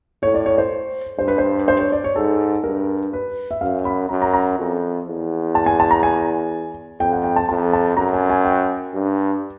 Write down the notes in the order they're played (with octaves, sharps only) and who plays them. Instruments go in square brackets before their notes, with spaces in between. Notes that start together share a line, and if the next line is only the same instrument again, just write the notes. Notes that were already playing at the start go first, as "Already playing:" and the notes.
[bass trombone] A2 [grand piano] C#5
[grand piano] D5
C#5
C5
[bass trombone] G2 [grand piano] C5
[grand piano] B4
C5
C5
C#5
D5
C#5
[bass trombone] G#2 [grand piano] A4
[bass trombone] G2 [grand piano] A#4
[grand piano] B4
E5
[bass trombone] F#2 [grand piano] F5
[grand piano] B5
[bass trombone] F#2 [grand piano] A#5
[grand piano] A#5
A#5
[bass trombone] F2
E2
[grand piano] A5
G#5
A5
A#5
G#5
[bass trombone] F2 [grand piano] G5
[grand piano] F#5
G5
A5
[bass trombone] F2 [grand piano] A5
[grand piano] A5
[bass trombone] F#2 [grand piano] A#5
[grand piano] G#5
G#5
G5
[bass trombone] G2